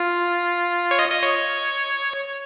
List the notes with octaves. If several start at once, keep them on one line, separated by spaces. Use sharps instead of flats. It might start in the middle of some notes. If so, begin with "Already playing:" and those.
Already playing: F4
C#5
D#5
D#5
C#5